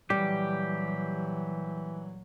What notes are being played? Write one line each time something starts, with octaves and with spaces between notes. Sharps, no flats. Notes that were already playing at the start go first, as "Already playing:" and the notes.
A#2 E3 F#3 G3 G4